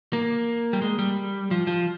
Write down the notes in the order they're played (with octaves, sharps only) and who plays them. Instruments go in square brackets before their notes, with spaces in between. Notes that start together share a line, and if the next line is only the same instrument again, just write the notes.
[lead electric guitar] A#3
G3
G#3
G3
F3
F3